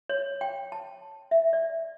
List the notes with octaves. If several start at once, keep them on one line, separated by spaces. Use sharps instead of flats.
C#5
G5
A5
E5
D5